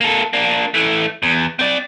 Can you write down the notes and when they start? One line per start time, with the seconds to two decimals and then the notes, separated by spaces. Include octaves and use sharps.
0.01 A#3 A4
0.33 A#3 D4
0.74 E3 A3
1.22 E2
1.59 C4 D5